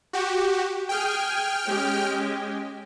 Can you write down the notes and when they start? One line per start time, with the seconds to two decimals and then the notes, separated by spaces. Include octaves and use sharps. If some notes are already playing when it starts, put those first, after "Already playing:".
0.13 F#4 G4
0.89 G#4 G5 G#5 F6
1.64 G#3 C#4 G4